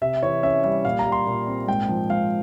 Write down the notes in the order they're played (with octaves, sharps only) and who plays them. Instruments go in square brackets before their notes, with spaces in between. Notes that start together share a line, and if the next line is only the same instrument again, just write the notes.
[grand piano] C3 E5
E3 C#5
C#4 E5
G3 E5
A#2 F5
A#5
G3
C6
A#2
C4
G#2 G5
F3
G#2 F5